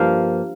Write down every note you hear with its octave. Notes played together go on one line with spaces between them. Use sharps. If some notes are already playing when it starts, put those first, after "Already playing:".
Already playing: G2 F3 A#3 F5